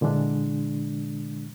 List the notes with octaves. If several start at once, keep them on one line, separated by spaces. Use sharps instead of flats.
A#2 D3 E3 G#3 D4